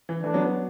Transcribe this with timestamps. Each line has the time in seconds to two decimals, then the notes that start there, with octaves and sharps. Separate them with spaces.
0.09 E3
0.23 E3 A3 D4
0.34 F#3 B3
0.44 F#3 B3